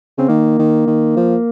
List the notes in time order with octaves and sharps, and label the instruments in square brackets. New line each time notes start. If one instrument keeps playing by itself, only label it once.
[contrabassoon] C#3 [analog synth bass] C4
[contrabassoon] D#3 [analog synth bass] A#3
[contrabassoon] D#3
D#3
F3